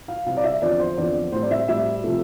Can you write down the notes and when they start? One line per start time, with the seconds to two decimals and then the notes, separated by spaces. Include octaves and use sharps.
0.08 F5
0.26 C3 G3 C4 F5
0.37 D5
0.44 E5
0.62 E2 D3 F3 C4 D5
0.79 C5
0.97 E2 D3 F3 C4 D5
1.32 A2 G3 C4 C5
1.42 D5
1.51 E5
1.68 A2 G3 C4 E5
2.04 C3 F3 A3